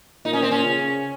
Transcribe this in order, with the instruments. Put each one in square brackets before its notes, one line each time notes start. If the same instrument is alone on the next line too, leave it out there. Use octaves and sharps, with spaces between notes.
[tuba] A#2 [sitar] D#4
[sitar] C#4
C4
C#4
[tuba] C#3